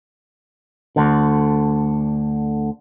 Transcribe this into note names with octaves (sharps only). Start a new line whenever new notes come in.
D2 D3